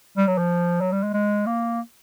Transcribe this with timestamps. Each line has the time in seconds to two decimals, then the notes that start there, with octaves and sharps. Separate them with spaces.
0.17 G3
0.27 F#3
0.38 F3
0.81 F#3
0.92 G3
1.03 G#3
1.14 G#3
1.47 A#3